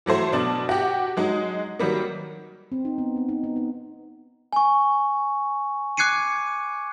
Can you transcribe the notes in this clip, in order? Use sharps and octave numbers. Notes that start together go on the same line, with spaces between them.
E3 F#3 A3 C5
B2 D4 A5
F#4 G4
F#3 G#3 D#4
D#3 F#3 G3 A#3
C4
D#4
B3
C4
D#4
B3
D#4
G#5 C#6
D6 F#6 G#6 C7 C#7 D#7